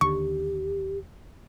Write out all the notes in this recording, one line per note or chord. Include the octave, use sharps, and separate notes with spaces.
D#2 D3 G4 C#6